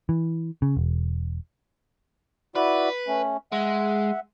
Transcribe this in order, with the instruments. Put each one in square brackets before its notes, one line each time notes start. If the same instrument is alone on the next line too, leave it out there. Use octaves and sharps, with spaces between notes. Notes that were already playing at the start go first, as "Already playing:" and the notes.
[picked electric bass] E3
C#3
E1
[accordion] E4 F#4 D5 [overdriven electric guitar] B4
[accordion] A3 C#4
[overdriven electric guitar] G#3 [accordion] E5 F#5